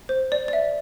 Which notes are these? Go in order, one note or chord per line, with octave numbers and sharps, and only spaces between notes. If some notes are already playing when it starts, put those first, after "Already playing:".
C5
D5
D5
E5